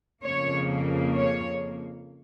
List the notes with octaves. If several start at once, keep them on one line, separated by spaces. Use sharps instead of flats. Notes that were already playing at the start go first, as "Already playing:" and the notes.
F2 C#3 A#3 C#5
C#5